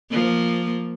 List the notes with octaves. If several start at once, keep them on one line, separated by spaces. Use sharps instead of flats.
F3 A#3